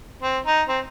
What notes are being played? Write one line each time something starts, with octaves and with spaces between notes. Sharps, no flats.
C4
D#4
C4